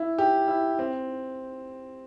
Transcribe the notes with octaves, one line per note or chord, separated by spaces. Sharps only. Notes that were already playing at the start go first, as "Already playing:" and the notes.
Already playing: E4
G4
E4
C4